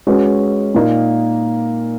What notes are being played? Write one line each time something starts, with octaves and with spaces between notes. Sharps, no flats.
G#3 C#4 F#4 B4
A#2 A#3 D#4 A#4